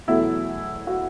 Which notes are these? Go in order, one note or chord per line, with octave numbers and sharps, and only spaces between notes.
E2 B2 F#3 A3 E4
F#4